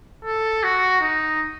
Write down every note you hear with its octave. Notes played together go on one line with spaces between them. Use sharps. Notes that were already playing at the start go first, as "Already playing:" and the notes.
A4
F#4
D#4